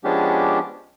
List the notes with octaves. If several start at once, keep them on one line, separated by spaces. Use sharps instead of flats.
F3 G#3 B3 C#4 D4 G4